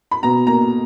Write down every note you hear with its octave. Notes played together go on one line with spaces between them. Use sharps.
B5
B2 A#5
A#3 A#5